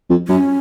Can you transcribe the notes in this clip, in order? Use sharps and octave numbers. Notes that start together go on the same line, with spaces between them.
F2
F#2 C#4